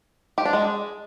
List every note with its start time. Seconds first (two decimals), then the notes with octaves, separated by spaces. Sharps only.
0.38 G4
0.45 D4
0.53 G#3